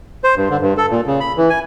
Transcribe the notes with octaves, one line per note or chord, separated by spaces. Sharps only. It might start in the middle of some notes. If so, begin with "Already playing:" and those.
C5
G2
D3
G2
A4
A#2
C#3
B5
E3
G#5